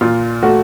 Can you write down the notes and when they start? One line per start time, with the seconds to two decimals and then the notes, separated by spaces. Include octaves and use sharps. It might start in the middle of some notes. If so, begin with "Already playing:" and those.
0.01 A#2 F4
0.43 A3 F#4